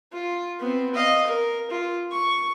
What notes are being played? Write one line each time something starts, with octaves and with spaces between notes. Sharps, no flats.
F4
B3 C4
D#5 F5
A#4
F4
C#6